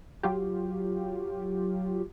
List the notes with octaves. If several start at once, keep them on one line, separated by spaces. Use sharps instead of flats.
F#3 F4 G4